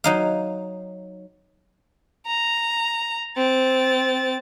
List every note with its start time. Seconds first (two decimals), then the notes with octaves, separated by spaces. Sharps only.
0.04 F#3 D#4 F5
2.27 A#5
3.37 C4 A6